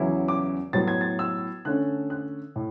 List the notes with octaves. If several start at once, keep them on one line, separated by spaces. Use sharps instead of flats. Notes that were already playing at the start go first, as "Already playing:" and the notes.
Already playing: E2 C#3 F#3 C#4 E4
D6
A2 F#3 B3 A6
G#6
A6
E6
D3 A3 C#4 F#6
F#6
A2